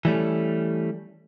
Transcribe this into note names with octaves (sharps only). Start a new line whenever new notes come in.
E3 G3 A3 C#4